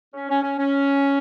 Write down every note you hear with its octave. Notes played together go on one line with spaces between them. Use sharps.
C#4
C#4
C#4
C#4